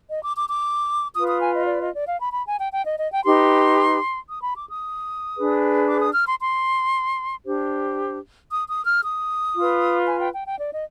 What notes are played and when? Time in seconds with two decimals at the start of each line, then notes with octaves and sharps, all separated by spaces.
0.10 D#5
0.23 D6
0.37 D6
0.49 D6
1.15 F4 B4 D#6
1.28 D#6
1.41 G#5
1.54 D#5
1.67 D5
1.81 D#5
1.94 D5
2.07 F5
2.20 B5
2.33 B5
2.46 G#5
2.59 G5
2.73 G5
2.86 D#5
2.99 D#5
3.12 G5
3.25 D#4 G4 B4 C6
4.30 D#6
4.43 B5
4.56 D6
4.69 D#6
5.35 D4 G#4 B4
5.88 D6
6.01 D#6
6.14 F6
6.27 C6
6.40 C6
7.45 D4 G4 C5
8.50 D#6
8.68 D#6
8.86 F6
9.03 D#6
9.55 F4 B4
10.07 G#5
10.21 G5
10.33 G5
10.47 G5
10.61 D5
10.73 D#5